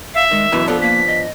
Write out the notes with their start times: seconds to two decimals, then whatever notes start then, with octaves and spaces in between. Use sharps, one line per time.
0.14 E5 F5
0.31 D#3 G#3
0.52 F#2 B2 E3 B4
0.67 F3 B3 D4 A4
0.81 A#3 B6
1.07 D#5